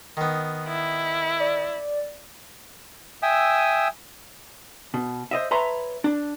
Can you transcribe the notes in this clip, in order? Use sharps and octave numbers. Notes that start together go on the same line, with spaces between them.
D#3 B3
E4
D5
E5 G5 G#5 D#6 E6
B2
C5 D#5 E5
B4 C#5 E5 A5 A#5 C6
D4